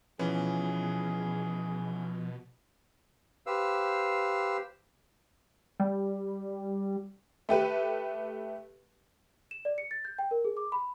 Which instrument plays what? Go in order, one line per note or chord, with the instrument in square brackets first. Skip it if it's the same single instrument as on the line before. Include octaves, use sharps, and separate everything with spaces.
[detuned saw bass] B2 [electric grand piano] E3 B3 C#4 [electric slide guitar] F3 [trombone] G#4
[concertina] G4 B4 C5 F5 E6
[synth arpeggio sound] G3
[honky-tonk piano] A3 G4 B4
[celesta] E7
D5
C#7
A6
G6
G5
A#4
G#4
D6
B5